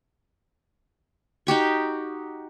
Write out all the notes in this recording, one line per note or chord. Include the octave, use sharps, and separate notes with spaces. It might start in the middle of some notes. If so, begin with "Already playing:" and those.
D#4 F#4 G4 C#6